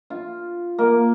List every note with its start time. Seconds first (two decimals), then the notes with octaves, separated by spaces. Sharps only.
0.10 F4
0.78 A#3